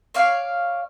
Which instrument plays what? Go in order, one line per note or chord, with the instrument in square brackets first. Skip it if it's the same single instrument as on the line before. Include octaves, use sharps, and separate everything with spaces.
[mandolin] C#5 D5 F5